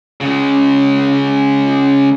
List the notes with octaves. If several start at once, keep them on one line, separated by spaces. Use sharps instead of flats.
C#3 G#3